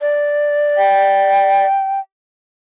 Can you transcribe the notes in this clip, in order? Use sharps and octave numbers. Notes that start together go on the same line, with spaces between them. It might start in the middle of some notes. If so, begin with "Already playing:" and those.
D5
G5